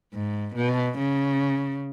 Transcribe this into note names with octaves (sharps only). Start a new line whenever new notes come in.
G#2
B2
C#3